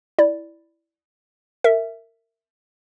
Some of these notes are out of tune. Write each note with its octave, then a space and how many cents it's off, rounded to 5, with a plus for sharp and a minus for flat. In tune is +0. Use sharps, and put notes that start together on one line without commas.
E4 +0 D5 +0
A#4 -25 E5 +0